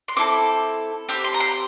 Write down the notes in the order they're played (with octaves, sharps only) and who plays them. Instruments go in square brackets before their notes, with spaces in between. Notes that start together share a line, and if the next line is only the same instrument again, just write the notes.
[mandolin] C6
C4 E4 A4 D6
C4 G4 E6
C6
A#5
C6